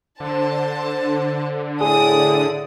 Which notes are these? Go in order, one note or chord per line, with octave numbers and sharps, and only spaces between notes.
D3 C5 A5
A2 G#4 D5 D#6